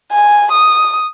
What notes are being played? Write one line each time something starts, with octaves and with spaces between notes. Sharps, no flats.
G#5
D#6